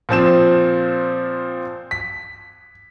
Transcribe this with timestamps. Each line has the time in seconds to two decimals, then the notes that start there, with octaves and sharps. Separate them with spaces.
0.09 A#2 F3 C4 E7
1.91 B6